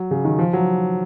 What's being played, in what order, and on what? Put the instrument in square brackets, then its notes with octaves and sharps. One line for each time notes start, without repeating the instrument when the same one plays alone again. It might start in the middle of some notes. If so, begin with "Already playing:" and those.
Already playing: [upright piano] F#3
C#3
D#3
F3
F#3